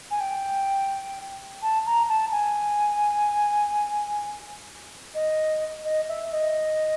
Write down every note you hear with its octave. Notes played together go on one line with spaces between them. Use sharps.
G#5
G5
A5
A#5
A5
G#5
D#5
D#5
E5
D#5